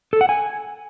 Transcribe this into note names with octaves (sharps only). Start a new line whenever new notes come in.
A4
F#5
G#5